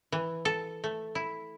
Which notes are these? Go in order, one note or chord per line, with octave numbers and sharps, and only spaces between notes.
E3
A4
A3
E4